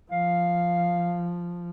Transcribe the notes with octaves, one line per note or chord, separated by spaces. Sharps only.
F3 F5